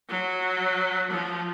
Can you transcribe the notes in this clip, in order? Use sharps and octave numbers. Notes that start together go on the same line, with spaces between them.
F#3
F3